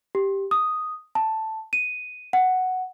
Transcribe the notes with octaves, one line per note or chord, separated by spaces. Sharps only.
G4
D#6
A5
D#7
F#5